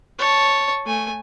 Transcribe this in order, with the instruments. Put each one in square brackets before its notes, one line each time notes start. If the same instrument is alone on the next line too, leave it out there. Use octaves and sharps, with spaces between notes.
[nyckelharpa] C#5 A5
A3 G#5